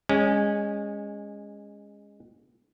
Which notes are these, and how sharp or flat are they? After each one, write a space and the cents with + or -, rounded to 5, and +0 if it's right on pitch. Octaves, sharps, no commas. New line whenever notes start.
G#3 -20 C#4 +0